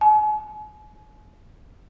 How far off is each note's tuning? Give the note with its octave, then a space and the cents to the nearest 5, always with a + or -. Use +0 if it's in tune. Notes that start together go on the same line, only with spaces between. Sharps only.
G#5 +40